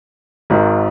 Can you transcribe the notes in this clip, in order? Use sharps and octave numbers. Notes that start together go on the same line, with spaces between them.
G#1 G#2 D#3